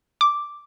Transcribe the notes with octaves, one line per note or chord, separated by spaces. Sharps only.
D6